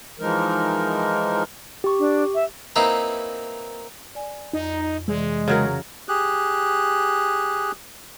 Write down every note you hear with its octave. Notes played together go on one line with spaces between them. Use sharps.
E3 F3 G#3 D#4 A#4
G4 C#6
D4
E5
A#3 C4 D#4 E4 B4 C5
D5 G#5
F2 D#4
C3 E3 G#3 D5
C#3 F#3 A#4
G4 G#4 F#6